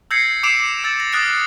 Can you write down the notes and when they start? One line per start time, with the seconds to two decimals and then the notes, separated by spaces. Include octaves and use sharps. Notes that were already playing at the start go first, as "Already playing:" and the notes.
0.11 E6 G6 G#6 A#6 C7 C#7
0.43 D6 E6 C7 D7 E7 F7
0.84 E6 A6
1.00 A#6
1.13 D#6 F6 F#6 A6 A#6 D7